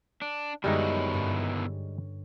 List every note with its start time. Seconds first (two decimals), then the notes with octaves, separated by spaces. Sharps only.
0.22 D4
0.64 F#2 B2 D3 D#3 G3 G#3 D#4 E4
1.14 G2